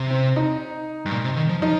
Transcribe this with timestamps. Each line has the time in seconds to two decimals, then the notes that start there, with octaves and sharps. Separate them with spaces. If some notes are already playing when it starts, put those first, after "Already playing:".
Already playing: C3
0.10 C4
0.36 D#4
1.06 G2
1.11 A#2
1.24 C3
1.36 D#3
1.49 F3
1.62 F3 D#4